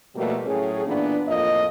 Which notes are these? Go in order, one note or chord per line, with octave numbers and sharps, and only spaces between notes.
B2 F3 G3 A3 A#3
A2 F#3 C#4 G#4
A#2 E3 A#3 B3 D4
F2 A2 A#3 F4 D#5